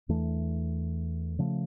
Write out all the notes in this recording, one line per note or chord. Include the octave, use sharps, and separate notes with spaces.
E2 E3 A3 D4
C#3 F3 A3